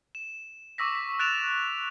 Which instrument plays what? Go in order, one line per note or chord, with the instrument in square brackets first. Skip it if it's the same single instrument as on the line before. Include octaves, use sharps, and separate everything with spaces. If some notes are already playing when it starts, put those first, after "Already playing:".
[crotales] E7
C#6 D6 E6 A#6 B6
B6
F#6 A6 D7 E7 F7